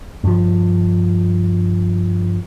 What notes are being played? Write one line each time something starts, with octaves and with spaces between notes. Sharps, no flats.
G2 F3